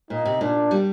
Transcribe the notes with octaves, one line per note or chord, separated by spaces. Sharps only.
A#2 D#4
C3
A#2 D4
G3